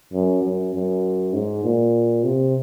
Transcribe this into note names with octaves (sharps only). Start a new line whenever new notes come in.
F#2
F#2
F#2
G#2
A#2
C3